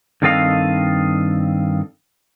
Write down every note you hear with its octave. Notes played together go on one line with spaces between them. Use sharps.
G2 D#3 C4 A4 D#5 F5